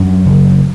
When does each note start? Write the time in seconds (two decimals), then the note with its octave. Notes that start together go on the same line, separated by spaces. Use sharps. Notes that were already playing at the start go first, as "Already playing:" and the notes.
Already playing: F#2 D4
0.26 F#1